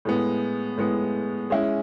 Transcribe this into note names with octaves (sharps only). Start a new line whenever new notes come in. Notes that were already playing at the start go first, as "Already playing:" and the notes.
A2 G#3 B3
A2 G#3 B3
G#3 C#4 E4